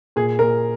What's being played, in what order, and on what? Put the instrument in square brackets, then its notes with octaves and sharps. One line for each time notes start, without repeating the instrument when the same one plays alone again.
[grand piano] A#2 [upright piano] G#4
[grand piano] A#2 [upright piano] A#4